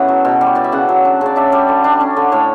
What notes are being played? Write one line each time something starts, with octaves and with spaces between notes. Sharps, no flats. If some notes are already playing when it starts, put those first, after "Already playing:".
Already playing: C#3 E3 A3 B3 E5 F#5
F#3
B2
G3
C#5
E3 D5
E5
C#3 F#5
F#3
D4
C#3 D5
D4 E5
G3 D5
D3
D4
C#4
D3
A2 C#5